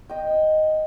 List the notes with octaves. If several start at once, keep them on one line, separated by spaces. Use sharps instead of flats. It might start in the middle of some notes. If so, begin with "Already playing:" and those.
D#5 G5